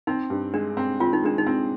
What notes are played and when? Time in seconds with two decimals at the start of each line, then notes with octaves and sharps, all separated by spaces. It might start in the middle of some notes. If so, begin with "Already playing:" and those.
0.07 C4 D#4
0.30 G2
0.54 G#3 D4
0.77 C4
1.00 C4 F4
1.13 D#4
1.23 G#3 D4
1.38 D#4
1.47 C4